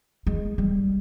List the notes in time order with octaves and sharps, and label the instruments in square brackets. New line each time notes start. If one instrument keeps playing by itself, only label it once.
[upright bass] G#3
G3